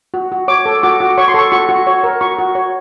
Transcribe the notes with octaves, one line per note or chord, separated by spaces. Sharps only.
F#4
F#4
C#5 D6
A4
F#4 D6
F#4
C#5 C#6
C6
A4 C#6
F#4 C#6
F#4
C#5
A#4
F#4 C#6
F#4
C#5